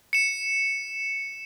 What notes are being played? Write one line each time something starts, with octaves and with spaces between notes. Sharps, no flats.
C#7 E7